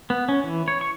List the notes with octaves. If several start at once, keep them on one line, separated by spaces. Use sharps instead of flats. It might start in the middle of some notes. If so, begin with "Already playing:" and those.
B3
C#4
E3
C#5
C#6